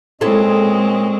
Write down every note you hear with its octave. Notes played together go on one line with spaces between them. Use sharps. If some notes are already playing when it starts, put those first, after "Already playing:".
A#2 G#3 C4 C#4 E4 A4 D#5